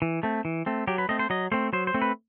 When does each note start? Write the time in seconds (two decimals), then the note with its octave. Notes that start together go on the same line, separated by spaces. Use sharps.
0.02 E3
0.23 A3 C4
0.45 E3
0.66 A3 C4
0.87 F#3 G4
0.98 B4
1.09 A3 C4 D#5
1.19 C5
1.30 F#3 D#5
1.52 A3 C4 C5
1.73 F#3 C5
1.87 C5
1.94 A3 C4
2.02 B4